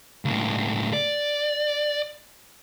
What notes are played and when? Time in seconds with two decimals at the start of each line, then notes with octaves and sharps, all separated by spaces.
0.25 C#2 A2
0.93 D5